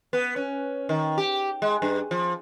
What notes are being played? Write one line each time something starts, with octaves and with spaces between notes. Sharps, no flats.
B3
C#4
D#3
G4
G#3
G2
F3